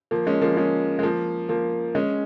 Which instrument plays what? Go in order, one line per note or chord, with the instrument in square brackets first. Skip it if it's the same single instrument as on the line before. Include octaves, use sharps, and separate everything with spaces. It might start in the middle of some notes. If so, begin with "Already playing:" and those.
[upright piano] F3 A#3
G#3 C#4
F3 A#3
G#3 C#4
G#3
F3 A#3
F3 A#3
G#3 C#4